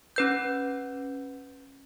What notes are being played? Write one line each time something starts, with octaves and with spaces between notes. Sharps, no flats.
C#4 B4 G6